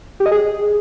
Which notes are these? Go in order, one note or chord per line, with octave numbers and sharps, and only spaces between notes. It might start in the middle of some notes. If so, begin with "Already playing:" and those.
G4
D#5
G#4